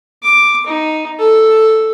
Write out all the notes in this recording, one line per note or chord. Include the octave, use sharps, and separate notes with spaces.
D6
D#4
A4